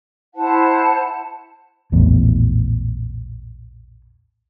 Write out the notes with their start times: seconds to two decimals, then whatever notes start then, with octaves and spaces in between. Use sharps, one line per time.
0.35 E4 C5 F#5 A5
1.92 A#1 E2 A2